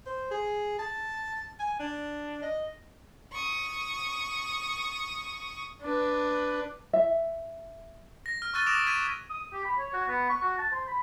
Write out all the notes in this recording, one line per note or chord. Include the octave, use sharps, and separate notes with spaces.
C5
G#4
A5
G#5
D4
D#5
C#6 D#6
D4 B4
E5
A#6
F6
C#6 E6 F#6 A6 D#7 G7
D6 D#6 A#6 D7 E7 F7
C#6 G#6 B6 D#7
D#6
G4
B5
C#5
F#4
B3
C#6
F#4
A5
C5
B5